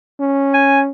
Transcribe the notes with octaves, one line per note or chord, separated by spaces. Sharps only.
C#4
G#5